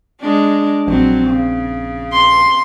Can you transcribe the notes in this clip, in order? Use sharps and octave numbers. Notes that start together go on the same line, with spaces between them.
G#3 D4
A#1 F#3 C4
C#3
C6